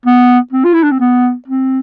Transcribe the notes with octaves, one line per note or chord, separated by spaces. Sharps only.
B3
C4
F4
E4
D4
C4
B3
C4